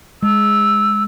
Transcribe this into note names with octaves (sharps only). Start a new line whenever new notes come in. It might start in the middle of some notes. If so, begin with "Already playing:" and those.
G#3 E6